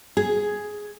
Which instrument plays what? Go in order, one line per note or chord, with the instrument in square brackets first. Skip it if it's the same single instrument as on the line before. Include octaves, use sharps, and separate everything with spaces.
[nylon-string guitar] G#4